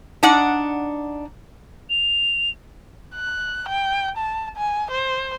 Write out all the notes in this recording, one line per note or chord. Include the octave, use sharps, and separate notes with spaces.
D4 D#4 D5 F#5
F7
F#6
G5
A5
G#5
C5